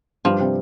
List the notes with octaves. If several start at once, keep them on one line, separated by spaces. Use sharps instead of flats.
G2 F3 G3
C3 C4